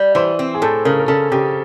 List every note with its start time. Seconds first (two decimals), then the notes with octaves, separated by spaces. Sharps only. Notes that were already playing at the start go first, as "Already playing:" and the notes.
Already playing: G3
0.15 E3 C5
0.39 C4
0.55 G#4
0.62 A2 A4
0.85 C#3 A#4
0.99 A#4
1.08 C#3 A4
1.32 C#3 G4